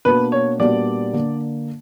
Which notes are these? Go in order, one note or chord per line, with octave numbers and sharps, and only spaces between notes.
B2 A#3 D4 F#4 B4
C#5
A#2 G3 B3 D4 F#4 D5
D3 A#3